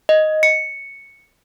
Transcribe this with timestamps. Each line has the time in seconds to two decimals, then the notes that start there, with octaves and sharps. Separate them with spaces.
0.09 D#5
0.43 C#7